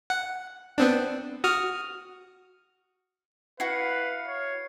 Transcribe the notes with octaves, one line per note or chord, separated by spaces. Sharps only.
F#5
B3 C4 D4
F#4 D#6 F6
E4 F#4 B4 F5 C7 C#7
C#5